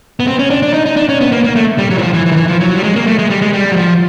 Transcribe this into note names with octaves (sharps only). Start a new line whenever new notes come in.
B3
C4
C#4
D4
D4
D#4
D#4
D4
C#4
B3
A#3
A#3
A3
G3
F#3
E3
F3
E3
E3
D#3
E3
F3
F#3
G3
G#3
A#3
A3
G#3
G3
G#3
G3
F#3
F3